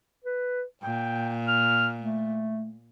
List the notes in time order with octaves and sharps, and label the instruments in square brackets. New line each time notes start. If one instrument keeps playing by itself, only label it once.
[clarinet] B4
[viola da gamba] A#2 [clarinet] G5
[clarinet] F6
A3